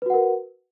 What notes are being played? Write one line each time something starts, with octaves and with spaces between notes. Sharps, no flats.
F#4 A#4 B4 F#5